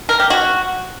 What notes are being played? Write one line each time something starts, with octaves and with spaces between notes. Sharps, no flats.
A#4
G4
F#4